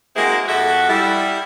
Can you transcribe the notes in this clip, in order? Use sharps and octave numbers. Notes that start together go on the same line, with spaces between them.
G#3 A#3 C4 E4 F#4 G#4
F2 F#4 A4 E5 F#5
G3 E4